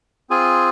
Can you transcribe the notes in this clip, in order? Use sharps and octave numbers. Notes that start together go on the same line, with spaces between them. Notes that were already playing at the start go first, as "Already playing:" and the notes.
C4 F4 G#4 G#5